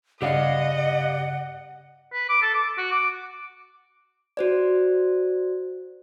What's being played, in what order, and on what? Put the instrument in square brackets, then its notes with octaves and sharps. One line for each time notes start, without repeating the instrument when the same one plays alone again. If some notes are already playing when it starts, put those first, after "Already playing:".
[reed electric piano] G2 C#3 [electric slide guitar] G4 D5 F5 [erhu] D#5 [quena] F#5
[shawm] B4
D6
A4
D6
F#4
D6
[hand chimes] F#4 C5 D5